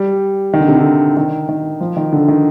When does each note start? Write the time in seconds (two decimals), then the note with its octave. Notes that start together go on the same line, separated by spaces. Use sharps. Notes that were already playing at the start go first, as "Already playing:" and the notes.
Already playing: G3
0.53 D#3
0.61 D3
0.68 C3
0.76 D3
1.17 D#3
1.49 D#3
1.81 F3
1.97 D#3
2.13 D3
2.28 D#3